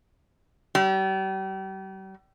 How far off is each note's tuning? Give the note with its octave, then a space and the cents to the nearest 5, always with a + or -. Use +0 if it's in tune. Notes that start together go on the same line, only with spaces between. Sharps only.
G3 -40